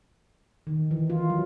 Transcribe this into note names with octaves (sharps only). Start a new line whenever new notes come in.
D#3
E3
F4
F#3